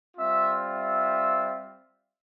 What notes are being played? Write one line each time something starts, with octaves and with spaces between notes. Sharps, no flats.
G3 C4 F4 E5
E5